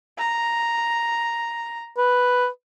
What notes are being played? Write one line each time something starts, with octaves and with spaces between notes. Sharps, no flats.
A#5
B4